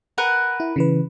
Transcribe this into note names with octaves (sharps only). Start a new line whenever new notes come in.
A#4 B4 F#5
E4
C#3 E3 B4